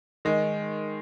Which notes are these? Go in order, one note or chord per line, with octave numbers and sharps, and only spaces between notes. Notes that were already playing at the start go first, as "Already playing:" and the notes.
D#3 G#3